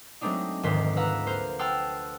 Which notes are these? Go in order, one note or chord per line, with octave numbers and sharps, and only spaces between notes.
F#3 G#3 A3 C4 D4 D#4
F1 D2 G#2 D#3 C6 B6
B4 F5 F#5 A#5 E6 F#6
A#3 C5 F6
F#5 G5 A5 C6 E6 F6